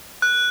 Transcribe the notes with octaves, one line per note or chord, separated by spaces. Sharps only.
F#6